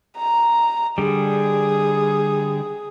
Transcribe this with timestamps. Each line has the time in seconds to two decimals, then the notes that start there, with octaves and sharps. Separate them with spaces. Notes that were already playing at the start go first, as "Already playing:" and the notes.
0.17 A#5
0.98 D3 G3 G#4